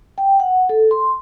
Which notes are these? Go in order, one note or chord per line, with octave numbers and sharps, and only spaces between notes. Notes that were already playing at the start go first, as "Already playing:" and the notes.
G5
F#5
A4
C6